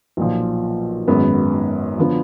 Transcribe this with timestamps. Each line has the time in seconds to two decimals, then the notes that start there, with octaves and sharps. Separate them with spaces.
0.17 B1 A#2 F3
1.07 G#1 F#2 D#3 G#3 B3
1.98 D3 F3 B3